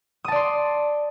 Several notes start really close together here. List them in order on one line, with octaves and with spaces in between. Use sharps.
D#6 A5 D5 C6